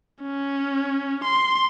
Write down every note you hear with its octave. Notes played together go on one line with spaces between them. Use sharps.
C#4
C6